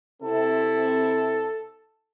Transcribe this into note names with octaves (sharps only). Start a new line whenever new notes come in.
C3 C4 E4 A4